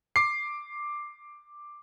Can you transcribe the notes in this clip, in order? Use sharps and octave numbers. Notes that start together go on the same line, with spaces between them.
D6 C7